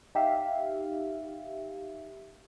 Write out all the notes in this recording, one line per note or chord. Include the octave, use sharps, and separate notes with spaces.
D#4 G4 E5 F5